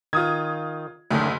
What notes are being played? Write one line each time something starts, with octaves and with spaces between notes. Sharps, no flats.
D#3 F4 D#6 G#6
F#1 D2 D3 D#3 C#4